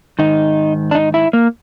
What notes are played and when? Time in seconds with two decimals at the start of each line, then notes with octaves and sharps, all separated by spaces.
0.19 G#2 D#3 D#4
0.91 D4
0.95 D#4
1.14 E4
1.33 A#3